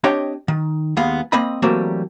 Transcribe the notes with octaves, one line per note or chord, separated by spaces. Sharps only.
C4 D4 G4 C#5 D#5 G5
D#3
D#2 G#3 B3 F5
A#3 C4 D#5 B5
E3 F#3 G3 A3 A#3 C4